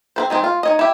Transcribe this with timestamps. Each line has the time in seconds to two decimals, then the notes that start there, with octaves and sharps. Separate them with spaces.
0.16 C4 B4 C5
0.30 D#3 G#3 C4
0.44 F4
0.63 D#4 C#5 D#5
0.79 E4 G4